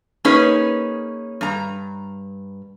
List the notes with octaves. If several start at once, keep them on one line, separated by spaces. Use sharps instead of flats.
A#3 C#4 D#4 G#4 B4 C#5
G2 A#5